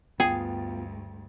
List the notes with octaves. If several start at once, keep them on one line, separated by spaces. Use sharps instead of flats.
D2 G2 B3 F4 G#4 G5